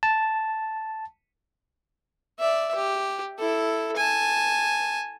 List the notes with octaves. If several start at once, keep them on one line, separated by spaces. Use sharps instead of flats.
A5
D5 E5
G4
E4 A4
G#5 A5